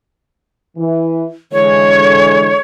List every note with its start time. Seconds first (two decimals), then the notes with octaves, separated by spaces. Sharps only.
0.77 E3
1.52 D3 E3 G#3 C#5